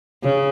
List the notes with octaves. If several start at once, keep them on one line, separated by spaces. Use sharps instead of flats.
C#3